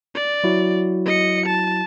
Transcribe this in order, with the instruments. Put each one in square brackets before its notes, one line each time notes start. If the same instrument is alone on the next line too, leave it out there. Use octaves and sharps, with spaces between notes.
[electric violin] D5
[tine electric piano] F#3 E4 F#4
[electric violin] D#5 C#7
A5